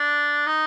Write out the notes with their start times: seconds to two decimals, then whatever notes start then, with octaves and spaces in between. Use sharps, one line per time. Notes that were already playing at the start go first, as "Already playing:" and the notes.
Already playing: D4
0.47 D#4